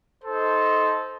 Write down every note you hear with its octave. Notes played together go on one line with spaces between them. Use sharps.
D#4 A4 C5